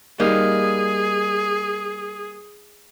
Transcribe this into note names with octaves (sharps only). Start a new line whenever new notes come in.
G3 A#3 D#4 G#4